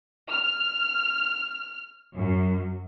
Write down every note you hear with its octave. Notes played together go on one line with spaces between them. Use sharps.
F6
F#2